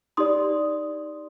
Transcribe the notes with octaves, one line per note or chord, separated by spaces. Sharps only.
D#4 G4 D5 C6 D#6